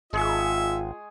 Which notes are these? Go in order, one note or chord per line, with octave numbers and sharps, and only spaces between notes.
G#1 G#3 F4 G#4 E5 C#6